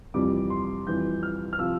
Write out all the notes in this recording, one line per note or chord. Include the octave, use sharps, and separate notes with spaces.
F2 C3 E3 G3 D6
C6
F2 E3 G3 G6
F6
F6
C3 F3 E6